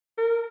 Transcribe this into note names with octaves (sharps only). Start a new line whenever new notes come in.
A#4